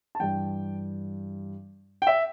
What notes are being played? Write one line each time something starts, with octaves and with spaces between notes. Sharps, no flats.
A5
G2 E3 G5
G5
E5